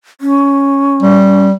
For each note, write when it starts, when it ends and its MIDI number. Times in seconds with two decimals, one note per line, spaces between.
0.21 1.46 61
1.03 1.52 55